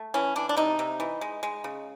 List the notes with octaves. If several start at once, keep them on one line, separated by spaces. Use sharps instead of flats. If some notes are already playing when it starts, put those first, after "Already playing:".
Already playing: A3
E3 C#4
E3 D4
D4
C3 D#4
C3
E3
G#3
G#3
C#3